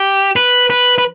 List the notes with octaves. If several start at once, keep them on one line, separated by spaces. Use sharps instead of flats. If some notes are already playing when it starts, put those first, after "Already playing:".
Already playing: G4
B4
B4
B4